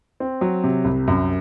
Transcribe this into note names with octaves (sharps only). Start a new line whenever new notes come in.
C4
F#3
C3
C2
F#2